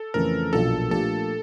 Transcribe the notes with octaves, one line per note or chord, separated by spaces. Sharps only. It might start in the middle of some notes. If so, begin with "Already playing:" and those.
Already playing: A4
F2 C#3 E3 A3 A#4
B1 A#2 F3 A#3 D4 A4
A#2 F3 A3 D4 G4 A4